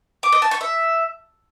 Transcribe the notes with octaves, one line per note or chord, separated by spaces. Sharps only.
D6
D#5
A5
C#6
E5